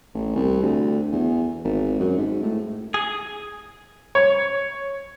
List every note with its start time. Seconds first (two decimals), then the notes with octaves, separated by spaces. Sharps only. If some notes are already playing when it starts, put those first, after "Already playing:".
0.14 A1
0.36 C2
0.62 D2
1.12 E2
1.64 G#1
2.00 F#2
2.17 G#2
2.43 A2
2.94 G#4
4.15 C#5